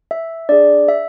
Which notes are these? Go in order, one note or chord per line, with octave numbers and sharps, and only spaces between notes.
E5
D4 G#4 D5
E5